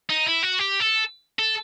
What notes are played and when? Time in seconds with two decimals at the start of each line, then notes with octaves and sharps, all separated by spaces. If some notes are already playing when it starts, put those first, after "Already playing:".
0.10 D#4
0.27 E4
0.43 F#4
0.59 G4
0.80 A4
1.39 A4